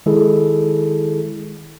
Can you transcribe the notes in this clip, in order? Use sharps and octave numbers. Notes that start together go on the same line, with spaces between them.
D#3 G#3 E4 G#4 A4